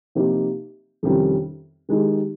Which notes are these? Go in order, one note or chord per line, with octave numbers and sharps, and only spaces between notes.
C3 F3 A#3 D#4 G4
F2 C3 D#3 G3 C#4
D#3 G#3 D#4 G4